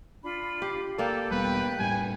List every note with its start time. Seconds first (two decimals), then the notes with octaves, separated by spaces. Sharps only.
0.22 D4 F4 B5
0.62 G4
0.98 A#3 A4 D5 G5
1.31 E1 G3 B3 B4
1.79 A2 G3 G#5